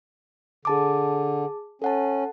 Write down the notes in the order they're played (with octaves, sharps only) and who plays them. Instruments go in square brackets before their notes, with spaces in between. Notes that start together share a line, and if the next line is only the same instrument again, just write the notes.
[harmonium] D3 [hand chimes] G#4 A5 D6
[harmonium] C#4 [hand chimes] A4 F#5 A5